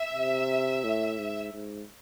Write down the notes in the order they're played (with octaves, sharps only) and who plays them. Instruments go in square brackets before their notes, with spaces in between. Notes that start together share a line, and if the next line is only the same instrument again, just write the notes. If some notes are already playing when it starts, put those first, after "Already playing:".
Already playing: [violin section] E5
[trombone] C3
A2
G#2
G#2